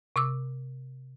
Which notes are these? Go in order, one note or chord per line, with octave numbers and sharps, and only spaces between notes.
C3 D6 E6